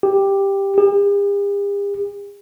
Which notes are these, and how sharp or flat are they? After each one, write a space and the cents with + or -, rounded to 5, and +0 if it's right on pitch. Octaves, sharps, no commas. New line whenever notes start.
G4 +5
G4 +45